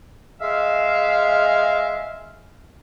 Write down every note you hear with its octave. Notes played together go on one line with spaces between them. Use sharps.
G#3 E5 F5